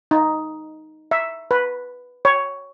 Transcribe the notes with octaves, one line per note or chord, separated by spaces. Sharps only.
D#4
E5
B4
C#5